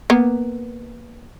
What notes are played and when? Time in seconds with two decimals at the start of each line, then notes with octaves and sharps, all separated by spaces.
0.10 A#3 B3